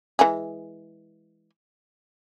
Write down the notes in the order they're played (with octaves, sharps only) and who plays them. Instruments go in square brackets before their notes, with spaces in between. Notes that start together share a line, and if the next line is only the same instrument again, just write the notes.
[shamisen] E3 G#3 G#4